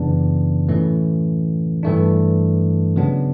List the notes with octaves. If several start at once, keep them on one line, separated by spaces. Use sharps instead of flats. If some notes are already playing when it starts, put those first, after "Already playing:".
Already playing: F#2 C#3 E3 B3 D4
A2 E3 A3 C#4
G2 E3 A3 D4
C#3 F#3 B3 D4